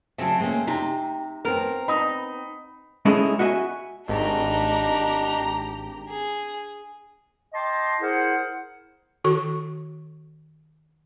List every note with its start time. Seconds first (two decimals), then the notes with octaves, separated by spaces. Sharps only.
0.18 C#3 F#3 A3 C4
0.40 G#3 A#3 C#4
0.67 C3 D#4 G4 A#5
1.45 B3 C4 A#4
1.88 D#4 B5 D#6
3.05 G#3 C#4 D#4 E4 G#4 A4
3.39 F#4 D#5 E5 G#5
4.08 G#1 D4 D#4 G4 A#5
6.09 G#4
7.53 D#5 G5 A5 C6 D6
8.01 E4 G#4 A#4 C5 F#5
9.24 D#3 F#4 A4 C#6